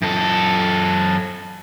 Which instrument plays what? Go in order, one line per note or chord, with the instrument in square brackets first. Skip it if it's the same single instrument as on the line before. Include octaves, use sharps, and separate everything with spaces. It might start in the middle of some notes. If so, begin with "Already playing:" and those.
[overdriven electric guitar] F#2 A4